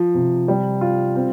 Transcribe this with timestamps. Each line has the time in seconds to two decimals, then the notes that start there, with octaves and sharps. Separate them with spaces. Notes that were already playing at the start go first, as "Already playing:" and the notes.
Already playing: F3
0.14 C3
0.48 G3
0.81 F4
1.16 C4